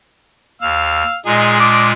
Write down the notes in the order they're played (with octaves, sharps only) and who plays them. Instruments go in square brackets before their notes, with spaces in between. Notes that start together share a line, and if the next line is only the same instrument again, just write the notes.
[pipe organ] D#2 [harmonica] F5 E6
[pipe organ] A#2 G#3 [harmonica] D#4 G#4
[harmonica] D4 D6 D#6